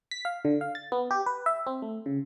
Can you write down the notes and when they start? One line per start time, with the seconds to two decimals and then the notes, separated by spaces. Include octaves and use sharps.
0.11 B6
0.25 F5
0.45 D3
0.61 F5
0.75 A6
0.92 B3
1.11 G4
1.26 B4
1.46 E5
1.67 C4
1.82 A3
2.06 C#3